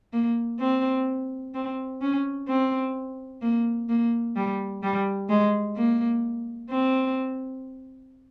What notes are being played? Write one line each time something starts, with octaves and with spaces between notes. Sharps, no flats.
A#3
C4
C4
C#4
C4
A#3
A#3
G3
G3
G#3
A#3
C4